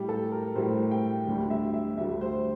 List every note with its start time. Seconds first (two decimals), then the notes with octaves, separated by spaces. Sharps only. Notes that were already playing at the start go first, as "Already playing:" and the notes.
Already playing: A2 G3 G4
0.09 A4
0.32 A#4
0.56 A2 G3 C5
0.91 G5
1.27 D2 D3 G3
1.50 E5
1.74 E5
1.97 D2 D3 G3 E5
2.21 C5